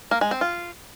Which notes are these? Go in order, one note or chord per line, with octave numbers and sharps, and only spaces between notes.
A#3
G#3
C4
F4